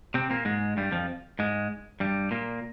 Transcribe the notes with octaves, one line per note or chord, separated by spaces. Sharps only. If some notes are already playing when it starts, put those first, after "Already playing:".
C3 C4
A#2 A#3
G#2 G#3
G2 G3
F2 F3
G#2 G#3
G2 G3
A#2 A#3